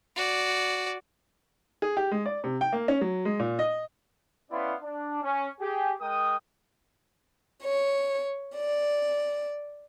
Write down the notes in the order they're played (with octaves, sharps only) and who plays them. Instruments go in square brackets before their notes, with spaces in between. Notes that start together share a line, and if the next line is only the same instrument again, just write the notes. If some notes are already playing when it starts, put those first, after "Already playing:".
[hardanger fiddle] F#4 D5
[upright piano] G#4
G4
G#3
D5
C3
G5
A#3
C#4
F#3
G#3
A#2
D#5
[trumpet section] B3 C#4 E4 D5 F5 C6
D4
C#4
G4 G#4
G#3 A#4 G5 D#6
[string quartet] C#5
D5